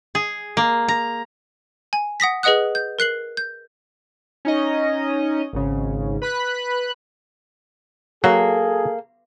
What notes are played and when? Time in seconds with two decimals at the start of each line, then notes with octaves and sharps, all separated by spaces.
0.15 G#4
0.57 A#3
0.88 A#5
1.93 G#5
2.20 F#5 D#6 A#6 B6
2.43 G#4 B4 D#5 F#5 D#6 F#6
2.75 G6
2.99 A#4 F#6 C7 F#7
3.37 G6
4.45 C#4 D#4 D#5
5.53 G#1 G#2 C#3
6.22 B4 B5 F#6
8.24 F#3 A#3 G#4 A4